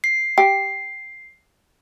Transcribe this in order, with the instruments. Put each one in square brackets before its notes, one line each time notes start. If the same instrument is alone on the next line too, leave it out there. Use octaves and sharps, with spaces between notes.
[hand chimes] C7
[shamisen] G4 [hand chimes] C7